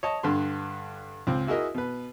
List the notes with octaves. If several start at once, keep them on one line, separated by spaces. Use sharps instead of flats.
C#5 D#5 A5
G2 D3 C6
C#2 C4
E4 F#4 G#4 A#4 D#5 E5
B2 B4